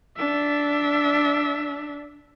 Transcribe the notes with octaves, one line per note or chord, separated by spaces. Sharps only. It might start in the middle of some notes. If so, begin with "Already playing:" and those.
D4 E5